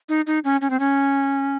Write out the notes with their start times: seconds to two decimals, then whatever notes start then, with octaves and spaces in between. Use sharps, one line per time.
0.09 D#4
0.27 D#4
0.45 C#4
0.61 C#4
0.70 C4
0.80 C#4